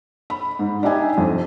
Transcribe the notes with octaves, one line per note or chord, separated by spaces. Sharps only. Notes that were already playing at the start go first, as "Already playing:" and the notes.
B5
G#2
D4 D#4 G4 E5 G#5
F2